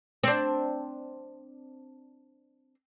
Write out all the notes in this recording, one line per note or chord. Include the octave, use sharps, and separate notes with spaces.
C4 D4